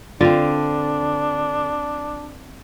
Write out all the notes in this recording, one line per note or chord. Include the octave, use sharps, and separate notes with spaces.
D3 C4 D4 F4